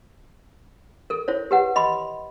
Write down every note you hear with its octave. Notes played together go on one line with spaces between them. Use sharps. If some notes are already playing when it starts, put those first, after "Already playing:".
A4 A#4
E4 C5 C#5
G4 B4 F#5
D#5 B5 C6